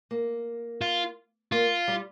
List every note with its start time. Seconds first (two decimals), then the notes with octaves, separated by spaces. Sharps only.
0.11 A#3
0.81 F4
1.52 A#3 F4
1.88 G3